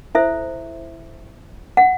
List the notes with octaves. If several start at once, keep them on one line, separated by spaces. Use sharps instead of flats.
E4 A4 C5 E5
F#5